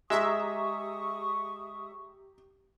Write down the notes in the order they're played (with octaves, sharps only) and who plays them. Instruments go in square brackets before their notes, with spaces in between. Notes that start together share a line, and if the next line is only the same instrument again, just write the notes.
[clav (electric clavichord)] G#3 [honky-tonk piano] G4 A#5 [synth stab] E5 [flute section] C#6 D#6